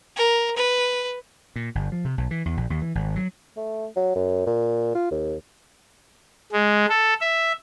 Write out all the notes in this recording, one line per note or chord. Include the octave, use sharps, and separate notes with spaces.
A#4
B4
A#2
G1
F3
C3
B1
E3
E2
A#1
D#2
E3
G#1
F#3
A3
F#3
F#2
A#2
F4
D#2
G#3
A4
E5